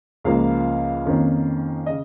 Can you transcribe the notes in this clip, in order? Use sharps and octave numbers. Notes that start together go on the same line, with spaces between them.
C#2 C#3 F3 A#3 F5
F2 D#3 A#3 C#4
C#3 D#5